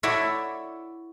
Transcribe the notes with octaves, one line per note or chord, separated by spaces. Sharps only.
E4 F#4 A4 C#5 D5 E5